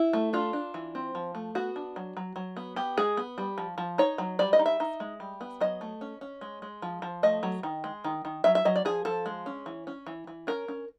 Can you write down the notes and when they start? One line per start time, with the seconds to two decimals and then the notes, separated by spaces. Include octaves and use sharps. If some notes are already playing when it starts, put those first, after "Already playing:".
Already playing: E4
0.13 A3
0.33 D4 F4
0.53 D4
0.74 E3
0.95 C4
1.15 F3
1.35 A3
1.55 B3 F#4
1.76 D4
1.96 F#3
2.17 F#3
2.36 F#3
2.57 B3
2.76 B3 G4
2.98 G#3 G#4
3.17 B3
3.38 G3
3.58 F3
3.78 F3
3.98 D#4 C#5
4.18 F#3
4.39 G3 D5
4.53 D#5
4.59 D#4
4.66 E5
4.80 D#4
5.00 G#3
5.20 G3
5.41 B3
5.61 F#3 D#5
5.81 A3
6.01 C#4
6.21 C#4
6.41 G#3
6.62 G#3
6.82 F3
7.02 F3
7.23 A3 D#5
7.43 F#3
7.63 D#3
7.84 G#3
8.04 D#3
8.25 D#3
8.44 F#3 E5
8.55 E5
8.65 F#3 D#5
8.76 D5
8.85 F3 G#4
9.05 F3 A4
9.26 G#3
9.46 C#4
9.66 E3
9.87 C#4
10.07 E3
10.27 E3
10.47 C#4 A#4
10.68 C#4